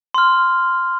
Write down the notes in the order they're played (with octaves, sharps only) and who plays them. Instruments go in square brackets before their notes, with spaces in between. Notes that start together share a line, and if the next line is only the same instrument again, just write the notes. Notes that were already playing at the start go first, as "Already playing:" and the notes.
[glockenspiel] C6 F6